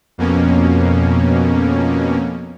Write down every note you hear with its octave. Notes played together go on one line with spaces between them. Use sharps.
F2 B2 A#3 C#4